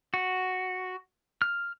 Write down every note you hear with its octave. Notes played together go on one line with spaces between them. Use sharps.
F#4
F6